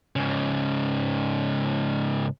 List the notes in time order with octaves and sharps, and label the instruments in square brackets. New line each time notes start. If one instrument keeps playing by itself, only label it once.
[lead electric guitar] G#2 C#3